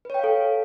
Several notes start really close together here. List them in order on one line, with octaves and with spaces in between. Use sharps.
B4 C#5 G5 F5 A4